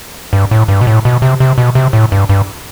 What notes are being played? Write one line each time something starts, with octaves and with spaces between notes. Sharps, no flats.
G2
A2
G2
B2
A2
B2
C3
C3
B2
C3
A2
G2
G2